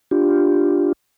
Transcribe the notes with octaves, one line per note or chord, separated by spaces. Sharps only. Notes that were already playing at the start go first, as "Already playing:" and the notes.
D4 F4 G4